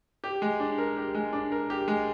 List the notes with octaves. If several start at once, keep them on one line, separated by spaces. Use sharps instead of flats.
G4
G#3
D4
A#4
G4
G#3
D4
A#4
G4
G#3